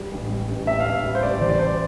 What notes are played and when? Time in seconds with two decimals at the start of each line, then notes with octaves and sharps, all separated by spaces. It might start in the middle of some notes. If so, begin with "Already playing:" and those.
Already playing: G3
0.12 A1
0.30 G3
0.49 A1
0.67 A2 E5
0.80 F5
0.86 A1 E5
1.04 G3
1.15 C5
1.23 A1 D5
1.41 E3 C5
1.49 D5
1.59 G3 C5